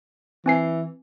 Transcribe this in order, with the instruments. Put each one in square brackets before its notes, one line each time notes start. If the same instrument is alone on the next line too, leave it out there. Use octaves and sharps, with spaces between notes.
[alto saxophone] E3 [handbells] C4 G#5 C7